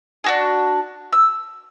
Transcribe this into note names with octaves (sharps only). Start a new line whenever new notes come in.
D4 F#4 G#4
E6